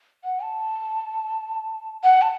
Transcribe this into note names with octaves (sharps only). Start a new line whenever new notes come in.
F#5
A5
F#5
A5